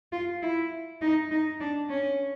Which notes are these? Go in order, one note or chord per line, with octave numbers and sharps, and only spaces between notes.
F4
E4
D#4
D#4
D4
C#4